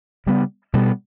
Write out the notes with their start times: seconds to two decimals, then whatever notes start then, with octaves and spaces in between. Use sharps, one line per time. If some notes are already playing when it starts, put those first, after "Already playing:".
0.26 C#3 G3 B3
0.73 B2 G3 B3